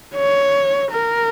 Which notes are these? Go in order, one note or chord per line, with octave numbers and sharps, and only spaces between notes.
C#5
A#4